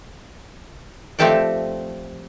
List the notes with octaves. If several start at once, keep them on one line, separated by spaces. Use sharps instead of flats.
F3 A3 C4 G4 A4 D5